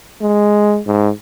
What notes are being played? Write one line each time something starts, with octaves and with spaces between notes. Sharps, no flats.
G#3
G#2